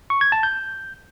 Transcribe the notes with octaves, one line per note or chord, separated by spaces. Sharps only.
C#6
G#6
A5
G6